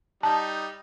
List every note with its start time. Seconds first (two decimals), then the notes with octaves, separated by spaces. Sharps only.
0.23 G3 D#4 A5